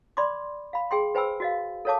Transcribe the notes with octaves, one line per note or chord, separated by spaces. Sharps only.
D5 B5 C6 D6
F5 B5
G#4 G5 C6
B4 C5 G5 G#5 B5 E6
F#4 D#5 F5
A4 A#4 C#5 F5 A5 D6